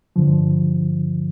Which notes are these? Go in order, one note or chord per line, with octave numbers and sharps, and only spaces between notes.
G2 D3 F3